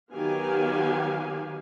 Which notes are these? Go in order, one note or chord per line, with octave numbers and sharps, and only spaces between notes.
D#3 F#3 B3 G4 F5 G#5